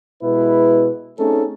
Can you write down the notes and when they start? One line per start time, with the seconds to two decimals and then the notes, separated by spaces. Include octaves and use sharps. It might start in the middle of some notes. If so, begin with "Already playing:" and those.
0.23 B2 G#3 E4 B4
1.19 A3 C4 C#4 D#4 G#4 A4